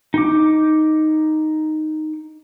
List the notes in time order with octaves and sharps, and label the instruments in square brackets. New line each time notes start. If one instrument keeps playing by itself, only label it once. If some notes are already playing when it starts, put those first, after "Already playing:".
[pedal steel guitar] D#4 D6